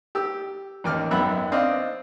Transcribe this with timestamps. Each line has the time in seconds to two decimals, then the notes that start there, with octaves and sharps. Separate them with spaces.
0.15 G4 E6
0.84 A1 D#2 D6 F6
1.11 G#1 F#2 B3 E5 F#5 B5
1.52 C4 D4 D5 D#5 F5